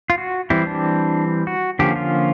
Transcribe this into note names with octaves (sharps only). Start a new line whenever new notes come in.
F4
F#4
E3 G3 C4 E4
D4
F#4
D3 F3 A#3 C#4 G4
F4